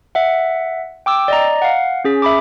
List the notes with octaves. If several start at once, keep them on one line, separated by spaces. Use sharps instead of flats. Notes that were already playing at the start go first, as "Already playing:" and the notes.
E5 F#5
G5 D6 E6
D5 D#5 A#5
F5 F#5
C#4 G#4 B6
E5 B5 D6